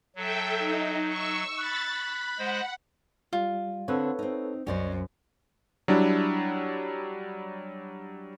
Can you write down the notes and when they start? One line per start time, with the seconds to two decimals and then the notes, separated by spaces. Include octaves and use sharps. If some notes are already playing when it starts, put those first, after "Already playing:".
0.15 F#3 A4 E5 G5
0.59 D#4
1.08 C#6 E6
1.57 B5 F#6 A6
1.88 B5
2.39 G#3 C5 F#5 A#6
3.33 G3 F4
3.88 D3 B3 C4 A4 B4 C#5
4.19 C4 D#4
4.67 C2 F#2 C#4 C5 D5 D#5
5.88 F#3 G3 D4 E4